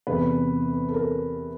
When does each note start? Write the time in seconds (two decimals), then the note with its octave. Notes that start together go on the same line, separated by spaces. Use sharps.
0.07 E2 C3 E3 B4
0.89 A4
0.94 A#4